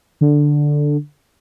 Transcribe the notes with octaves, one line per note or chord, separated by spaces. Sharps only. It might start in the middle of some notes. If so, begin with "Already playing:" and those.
D3